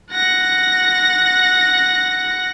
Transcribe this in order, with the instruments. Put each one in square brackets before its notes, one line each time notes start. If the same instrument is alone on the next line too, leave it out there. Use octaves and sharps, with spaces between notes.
[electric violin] F#5 A#6